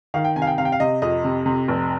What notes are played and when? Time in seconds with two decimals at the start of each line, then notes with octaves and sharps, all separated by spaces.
0.14 D#3 F5
0.25 G5
0.36 C3 G#5
0.42 F5
0.47 G5
0.58 C3 F5
0.65 G5
0.72 F5
0.80 C3 D#5
1.02 F2 D#5
1.24 C3
1.46 C3
1.68 F1